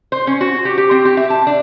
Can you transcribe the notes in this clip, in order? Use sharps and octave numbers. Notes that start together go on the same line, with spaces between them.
C5
C#4
F#4
G4
G4
C4
G4
E5
A5
D4